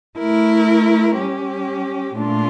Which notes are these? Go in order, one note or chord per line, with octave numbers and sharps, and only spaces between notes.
A3 E4 A#4
G3 C#4 G4
A#2 A3 D4 F4